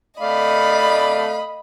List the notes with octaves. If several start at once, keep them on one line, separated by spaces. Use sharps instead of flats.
A3 D5 D#5 F5 B5